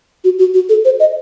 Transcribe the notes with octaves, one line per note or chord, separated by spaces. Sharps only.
F#4
F#4
F#4
A4
C5
D#5